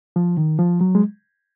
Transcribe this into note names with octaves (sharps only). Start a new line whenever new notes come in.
F3
D#3
F3
F#3
G#3